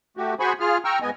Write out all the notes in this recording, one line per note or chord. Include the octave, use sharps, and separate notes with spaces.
A3 F#4 G4
F#4 G#4 C5 G#5 B5 C#6
F4 G#4 F6
G5 A#5 C#6 E6 F6
G#2 B3 D#5 G#5